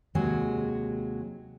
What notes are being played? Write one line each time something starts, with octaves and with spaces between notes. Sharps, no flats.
D#2 C3 F#3 G#3 F#4 G#4